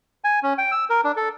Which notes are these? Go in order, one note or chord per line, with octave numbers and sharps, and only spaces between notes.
G#5
C#4
G5
E6
A#4
D4
A4